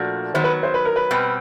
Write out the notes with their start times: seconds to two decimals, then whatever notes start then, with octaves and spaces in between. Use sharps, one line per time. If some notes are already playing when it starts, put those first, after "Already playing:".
Already playing: A#2 F3 A3 D4 F#4
0.34 D#3 F#3 B3 C5
0.44 B4
0.63 C5
0.74 B4
0.85 A#4
0.96 B4
1.11 B2 G3 C4